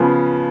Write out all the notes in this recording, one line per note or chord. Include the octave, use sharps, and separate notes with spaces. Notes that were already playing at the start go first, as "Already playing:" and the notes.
Already playing: C#3 F3 B3